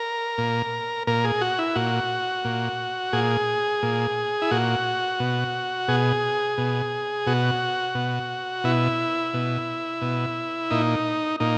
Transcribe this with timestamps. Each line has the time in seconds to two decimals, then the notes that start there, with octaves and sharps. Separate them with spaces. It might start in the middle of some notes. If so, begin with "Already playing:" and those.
Already playing: A#4
0.38 A#2
1.07 A#2 A#4
1.24 G#4
1.41 F#4
1.59 E4
1.75 A#2 F#4
2.45 A#2
3.13 A#2 G#4
3.83 A#2
4.42 E4
4.51 A#2 F#4
5.20 B2
5.88 B2 G#4
6.58 B2
7.27 B2 F#4
7.95 B2
8.64 B2 E4
9.34 B2
10.02 B2
10.71 A#2 D#4
11.40 A#2 D#4